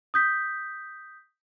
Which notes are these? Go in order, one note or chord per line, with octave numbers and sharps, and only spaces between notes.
D#6 G6 B6